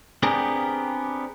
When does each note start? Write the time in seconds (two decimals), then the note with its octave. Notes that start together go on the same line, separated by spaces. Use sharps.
0.23 B3 C4 D4 G4 G#4 A#4